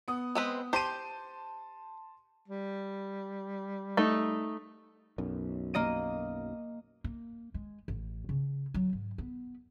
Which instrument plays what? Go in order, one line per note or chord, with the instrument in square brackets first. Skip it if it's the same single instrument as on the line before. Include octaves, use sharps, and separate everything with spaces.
[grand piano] B3 D#6
[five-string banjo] G#3 C4 B4
[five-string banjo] G4 C5 [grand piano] A5 C6 D#7
[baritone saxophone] G3
[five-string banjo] A3 D#4
[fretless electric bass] B1 F#2
[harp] A#3 D#5 D#7
[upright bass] A#3
G#3
A1
C#3
F#3
G#2
B3